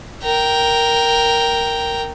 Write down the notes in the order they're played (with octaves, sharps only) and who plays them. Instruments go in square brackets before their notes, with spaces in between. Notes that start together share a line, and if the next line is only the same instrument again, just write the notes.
[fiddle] A#4 G5